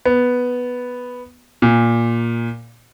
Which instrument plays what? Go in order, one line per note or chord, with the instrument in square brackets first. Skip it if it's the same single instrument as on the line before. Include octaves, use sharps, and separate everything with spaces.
[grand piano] B3
A#2